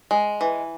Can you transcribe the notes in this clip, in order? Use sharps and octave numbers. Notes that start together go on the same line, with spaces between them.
G#3
E3